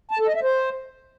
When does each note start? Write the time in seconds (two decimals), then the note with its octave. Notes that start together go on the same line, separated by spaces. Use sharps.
0.11 A5
0.19 A4
0.27 D#5
0.35 E5
0.43 C5